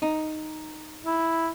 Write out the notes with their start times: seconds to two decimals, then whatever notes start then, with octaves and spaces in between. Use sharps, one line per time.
0.02 D#4
1.06 E4